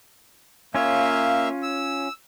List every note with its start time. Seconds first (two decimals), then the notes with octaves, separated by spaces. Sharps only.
0.75 A#3 C#4 F4 C#5 E5 F5
1.63 E6